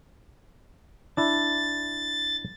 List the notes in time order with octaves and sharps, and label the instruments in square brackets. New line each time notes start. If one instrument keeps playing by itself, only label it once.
[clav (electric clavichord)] D4 E4 [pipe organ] A6